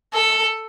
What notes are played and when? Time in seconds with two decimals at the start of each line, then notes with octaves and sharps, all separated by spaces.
0.13 A4